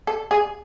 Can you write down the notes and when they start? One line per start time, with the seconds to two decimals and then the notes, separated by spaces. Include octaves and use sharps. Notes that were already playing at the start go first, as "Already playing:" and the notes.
0.07 A4
0.31 G#4